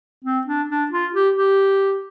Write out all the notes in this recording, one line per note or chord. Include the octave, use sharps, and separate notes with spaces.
C4
D4
D4
F4
G4
G4